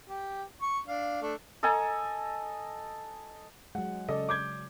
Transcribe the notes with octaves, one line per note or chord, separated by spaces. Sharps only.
G4
C#6
D4 F5
A3 D4
A4 D#5 G#5 A#5
F#3 G#3 F#5
C#3 A4 D5 D#5
D6 G6 G#6